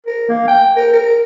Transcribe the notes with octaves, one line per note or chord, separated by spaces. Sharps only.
A#4
A#3
G5
A#4
A#4